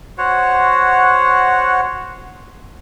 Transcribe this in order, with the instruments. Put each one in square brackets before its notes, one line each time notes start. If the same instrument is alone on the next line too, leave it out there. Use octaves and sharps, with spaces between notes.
[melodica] F#4 C5 C#5 F#5